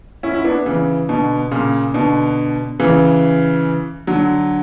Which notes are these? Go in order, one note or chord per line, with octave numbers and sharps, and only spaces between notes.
C#4 E4
E4
B3 D4
C#3 E3
B2 D3
A#2 C#3
B2 D3
C#3 E3
D3 F#3